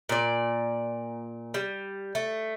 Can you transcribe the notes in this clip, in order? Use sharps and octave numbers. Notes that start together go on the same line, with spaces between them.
A#2 D5
G3
A3